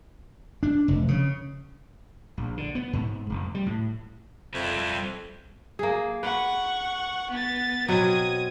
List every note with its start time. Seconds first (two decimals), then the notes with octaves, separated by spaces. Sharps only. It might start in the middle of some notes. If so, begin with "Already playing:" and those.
0.63 D4
0.88 F1
1.08 C#3
2.37 A#1
2.57 D3
2.75 B3
2.93 G#2
3.30 F1
3.55 G3
3.66 A2
4.54 F2 G3 E5
5.79 A#3 G#4
6.23 B4 F#5 C#6
7.31 B3 A6
7.88 B2 F#3 C4 D#6 G#6